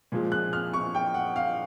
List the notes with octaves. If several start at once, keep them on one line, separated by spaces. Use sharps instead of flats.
A#2 F3 G#3
F#6
F6
C#6
G5
F#5
F5